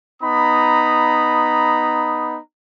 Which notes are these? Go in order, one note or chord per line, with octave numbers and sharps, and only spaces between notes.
B3 D#4 A#5 B5 D#6